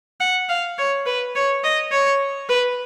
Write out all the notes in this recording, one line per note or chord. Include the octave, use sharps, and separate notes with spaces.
F#5
F5
C#5
B4
C#5
D#5
C#5
B4